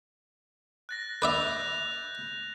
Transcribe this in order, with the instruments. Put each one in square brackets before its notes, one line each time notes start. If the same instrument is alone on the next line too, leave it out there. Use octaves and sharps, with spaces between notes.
[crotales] F#6 A6 A#6
[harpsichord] B4 D5 E5 [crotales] F#6 G6 F7